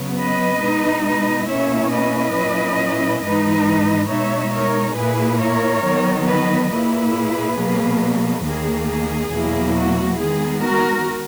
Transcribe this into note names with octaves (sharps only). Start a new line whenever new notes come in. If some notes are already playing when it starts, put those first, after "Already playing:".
Already playing: C#3 F#3 B3
B4 D#5
B2 G#3 D#4
B4 D#5
B2 A#3 C#4 E4 C#5 E5
B4 D#5
A#2 F#3 C#4 E4
G#2 E3 G#3 D#4 B4 D#5
B2 G#3 D#4 C#5 E5
A#4 C#5
A#2 A#3 E4 G#4 B4
A#4 C#5
D#3 F#3 B3
B4 D#5
A#2 A#3 E4 G#4 B4
B2 F#3 A#3
D#2 D#3 A#3 G#4
G#4
E2 B2 F#3 A#3 E4
F#4
D#3 G#3 B3 G#4
F#4 A#4